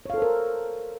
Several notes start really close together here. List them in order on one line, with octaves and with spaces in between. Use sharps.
C#5 F5 A4 C5 A#4